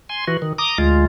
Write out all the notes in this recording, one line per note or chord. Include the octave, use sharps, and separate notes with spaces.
G#5 C6
E3 F#4
D#3
A#5 D6 D#6
D2 G#3 F4